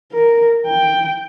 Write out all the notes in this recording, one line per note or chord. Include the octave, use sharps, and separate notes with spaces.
A#4
G5